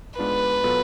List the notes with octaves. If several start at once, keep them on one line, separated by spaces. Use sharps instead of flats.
G#2 G#3 B3 D4 F4 B4
B2 F#3 B3 F4 A4